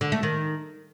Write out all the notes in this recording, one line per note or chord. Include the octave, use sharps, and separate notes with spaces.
D3
A3
D#3